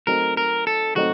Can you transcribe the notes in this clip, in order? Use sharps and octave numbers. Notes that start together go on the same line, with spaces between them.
F#3 A3 C4 D#4 A#4
A#4
A4
F#3 A3 C4 D#4 F#4